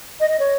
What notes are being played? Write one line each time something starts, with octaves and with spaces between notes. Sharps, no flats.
D#5
D#5
C#5